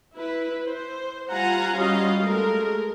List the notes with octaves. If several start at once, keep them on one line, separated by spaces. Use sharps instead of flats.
E4 B4
C5
G3 F4 F#5 G#5 A#5
G3 C#4 F4 F#4 D#5 F5
G#3 A3 A#4